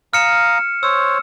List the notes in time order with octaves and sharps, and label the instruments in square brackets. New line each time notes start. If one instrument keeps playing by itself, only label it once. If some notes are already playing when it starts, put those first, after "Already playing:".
[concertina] F5 A#5 D#6 [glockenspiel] F6 C#7 E7
[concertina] C5 C#5 [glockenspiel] E6